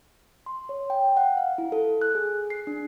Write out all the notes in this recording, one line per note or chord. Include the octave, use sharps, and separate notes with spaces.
C6
C#5
G5
F#5
F5
E4
A4
F#6
G#4
C7
D4